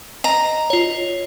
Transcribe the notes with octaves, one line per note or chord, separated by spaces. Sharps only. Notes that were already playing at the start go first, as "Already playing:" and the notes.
D#5 A#5
F4 C#5